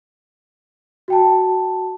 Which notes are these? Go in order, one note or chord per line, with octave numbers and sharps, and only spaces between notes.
F#4 G5 A5